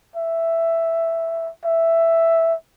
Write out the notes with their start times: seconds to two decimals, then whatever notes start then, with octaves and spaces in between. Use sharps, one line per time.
0.16 E5
1.65 E5